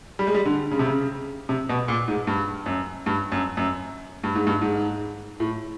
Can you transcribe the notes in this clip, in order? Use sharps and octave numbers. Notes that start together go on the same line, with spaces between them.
G3
G#3
G3
D3
C#3
C3
C#3
C3
B2
A#2
G#2
G2
F#2
G2
F#2
F#2
G2
G#2
G2
G#2
A2